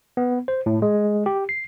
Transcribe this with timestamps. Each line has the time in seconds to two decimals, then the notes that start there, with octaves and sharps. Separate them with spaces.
0.17 B3
0.48 C5
0.66 A2
0.82 G#3
1.26 G4
1.49 C7